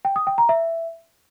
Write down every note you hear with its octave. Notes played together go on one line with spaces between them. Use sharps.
G5
D#6
G5
A#5
E5